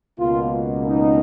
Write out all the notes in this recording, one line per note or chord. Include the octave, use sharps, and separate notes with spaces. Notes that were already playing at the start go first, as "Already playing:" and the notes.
C#2 B2 A#3 F4
D#4